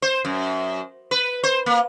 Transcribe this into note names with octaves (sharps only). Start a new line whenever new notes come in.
C5
F#2
B4
C5
A#3